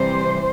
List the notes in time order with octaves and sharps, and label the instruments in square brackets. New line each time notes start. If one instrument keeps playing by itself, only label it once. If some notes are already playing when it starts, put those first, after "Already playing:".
Already playing: [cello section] C3 E3 G3 C5